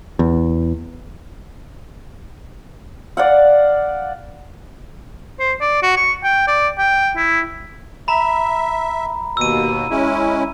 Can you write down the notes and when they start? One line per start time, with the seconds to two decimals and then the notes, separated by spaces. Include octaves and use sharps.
0.19 E2
3.17 D5 F5 F#5
5.40 C5
5.61 D5
5.83 F#4
5.97 C#6
6.24 G5
6.47 D5
6.79 G5
7.16 E4
8.08 E5 A#5 B5
9.37 D#2 B2 E6 D#7
9.90 G#3 C#4 E4